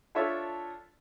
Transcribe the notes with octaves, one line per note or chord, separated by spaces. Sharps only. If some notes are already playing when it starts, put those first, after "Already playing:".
D4 F4 A4 C#5 E5